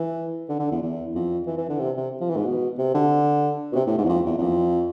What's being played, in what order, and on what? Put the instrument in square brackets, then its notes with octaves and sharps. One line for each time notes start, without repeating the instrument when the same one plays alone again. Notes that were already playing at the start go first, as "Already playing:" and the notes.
Already playing: [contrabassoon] E3
D3
D3
E2
E2
F2
E3
E3
D3
C3
C3
F3
E3
G#2
B2
C3
D3
B2
C3
A2
G#2
E2
F2
E2
E2
F2